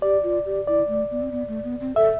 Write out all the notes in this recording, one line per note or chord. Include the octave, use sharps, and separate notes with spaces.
G4 D5
F4
G4
E4 D5
A3
B3
C4
B3
A3
B3
C4
A4 E5